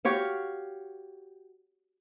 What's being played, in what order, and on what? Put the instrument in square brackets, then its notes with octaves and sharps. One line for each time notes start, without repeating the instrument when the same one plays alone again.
[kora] F#4 G4 C#5 F5